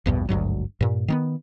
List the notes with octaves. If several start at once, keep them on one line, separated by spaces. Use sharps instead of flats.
A#1 E2 G2 B2
G#1 D2 G2 F#3
G2 A#2
D#3 A#3 B3